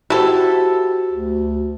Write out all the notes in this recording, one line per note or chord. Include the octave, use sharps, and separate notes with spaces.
E4 F#4 G4 A4 C5
D2